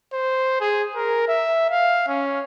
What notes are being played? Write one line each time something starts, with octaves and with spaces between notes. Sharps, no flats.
C5
G#4
A#4
E5
F5
C#4